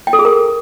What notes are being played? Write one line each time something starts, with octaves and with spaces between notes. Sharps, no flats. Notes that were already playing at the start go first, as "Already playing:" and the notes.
G5
A4
G#4
A#4